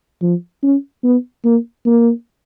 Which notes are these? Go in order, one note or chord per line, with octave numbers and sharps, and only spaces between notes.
F3
C#4
B3
A#3
A#3